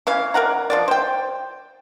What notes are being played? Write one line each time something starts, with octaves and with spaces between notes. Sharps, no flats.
E3 C#4 F5
A#4 D5 F#5 A#5
F3 B3 D5
C5 G5